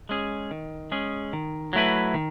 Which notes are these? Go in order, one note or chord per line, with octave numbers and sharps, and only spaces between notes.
G#3 C#4 G#4
D#3
G#3 C#4 G#4
D#3
F#3 A3 E4 B4
D#3